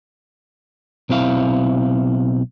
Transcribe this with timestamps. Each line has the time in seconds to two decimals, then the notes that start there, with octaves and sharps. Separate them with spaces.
1.09 B1 C4 E4 F5